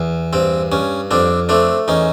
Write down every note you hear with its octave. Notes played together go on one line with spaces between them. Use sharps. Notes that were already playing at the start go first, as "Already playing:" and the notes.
Already playing: E2
G2 C4
G2 C#4
F2 C4 D4
A3 C4 D4
E2 C#4 D#4